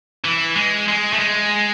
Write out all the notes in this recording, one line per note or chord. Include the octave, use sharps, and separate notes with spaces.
E3
G#3
G#3
A3
G#3